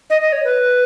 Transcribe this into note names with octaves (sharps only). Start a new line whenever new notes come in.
D#5
D#5
C#5
B4